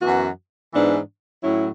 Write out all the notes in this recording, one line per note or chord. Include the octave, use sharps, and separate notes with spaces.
F#2 E3 B3 F#4
G#2 E3 B3 D4
A2 F#3 C#4 E4